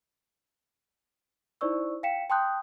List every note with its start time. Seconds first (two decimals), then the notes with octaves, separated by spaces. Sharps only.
1.61 D#4 E4 C5 D5 C#6 E6
2.03 F5 G5 B6 C#7 E7
2.30 G5 A5 C6 D#6 F#6 G6